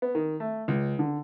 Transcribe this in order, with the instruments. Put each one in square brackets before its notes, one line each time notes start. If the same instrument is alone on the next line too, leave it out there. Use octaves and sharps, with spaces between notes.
[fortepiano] B3
D#3
A3
C#2
D3